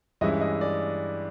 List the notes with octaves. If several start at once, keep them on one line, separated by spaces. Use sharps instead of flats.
G2 E3 G#3 C#4 E4 D#5
D#5
D5